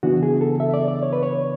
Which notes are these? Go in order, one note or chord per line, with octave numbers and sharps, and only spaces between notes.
C#3 E3 B3 D4 F#4
G#4
A4
E5
D5
D5
C#5
B4
C#5